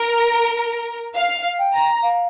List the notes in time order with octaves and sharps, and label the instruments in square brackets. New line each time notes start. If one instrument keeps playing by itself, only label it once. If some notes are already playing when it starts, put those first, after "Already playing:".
Already playing: [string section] A#4
F5
[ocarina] G5
[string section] A#5
[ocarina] F5